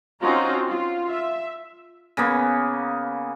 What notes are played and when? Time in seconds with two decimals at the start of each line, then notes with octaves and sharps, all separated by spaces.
0.21 C4 C#4 D#4 F4 F#4 A#5
0.68 F4
1.10 E5
2.17 C#3 A#3 B3